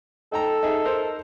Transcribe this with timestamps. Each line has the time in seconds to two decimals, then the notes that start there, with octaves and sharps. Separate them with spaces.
0.32 D#4 A4 G5 A#5
0.63 D#4 G#4 E5
0.85 D#4 A#4 C5